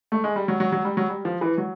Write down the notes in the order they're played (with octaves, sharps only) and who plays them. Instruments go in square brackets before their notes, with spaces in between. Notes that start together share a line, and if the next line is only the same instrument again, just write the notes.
[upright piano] A3
G#3
G3
F#3
F#3
F#3
G3
F#3
G3
F3
E3
F#3